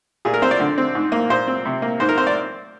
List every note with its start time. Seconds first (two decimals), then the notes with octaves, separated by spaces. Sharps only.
0.25 A#2 G#4
0.34 A#4
0.42 C4 C5
0.51 D5
0.60 D3
0.78 C4
0.95 G#2
1.12 A#3
1.30 A#2 C5
1.47 C4
1.65 C3
1.82 A#3
2.00 G#2 C5
2.09 A#4
2.17 C4 C5
2.27 D5